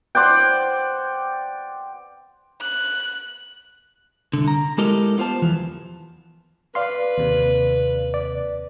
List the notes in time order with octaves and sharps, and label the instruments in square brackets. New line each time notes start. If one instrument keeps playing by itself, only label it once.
[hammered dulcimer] C5 D5 F#5 G5
[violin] F#6
[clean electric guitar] C2 D3
A#5
G#3 E4 G4 A4 A#4 D#5
B3 F4 C5 A5
E2 E3 F3
[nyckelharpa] B4 [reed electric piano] D5 F5 C6
[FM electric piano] D#2 C3
[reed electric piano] D5